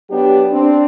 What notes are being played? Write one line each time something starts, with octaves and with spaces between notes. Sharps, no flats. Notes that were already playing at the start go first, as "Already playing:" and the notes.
F#3 B3 D4 G4
C4 D4